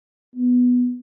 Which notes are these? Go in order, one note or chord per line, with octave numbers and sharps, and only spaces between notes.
B3